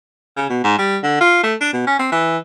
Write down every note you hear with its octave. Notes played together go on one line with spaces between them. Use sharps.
C#3
B2
G#2
G3
D3
F4
A3
D4
B2
C#4
C4
E3